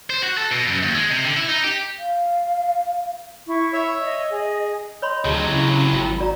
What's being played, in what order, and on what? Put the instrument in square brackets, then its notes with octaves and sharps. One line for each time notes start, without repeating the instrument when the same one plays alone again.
[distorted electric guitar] C5
F#4
A4
B2
F#2
D#2
G#3
C3
D3
E4
D#4
G4
[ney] F5
[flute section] E4 C#6
[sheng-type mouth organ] C#5 E5
[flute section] D#5
[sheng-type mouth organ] G#4
[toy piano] C#5 B5 C6 [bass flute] D#5
[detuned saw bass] D2 [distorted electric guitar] C3 F#3 [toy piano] F4 G#4 A5
[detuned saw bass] C#3 [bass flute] E4
[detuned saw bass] G#1 [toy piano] F4 G5 A5
[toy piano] F4 D5 A#5 [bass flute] F#4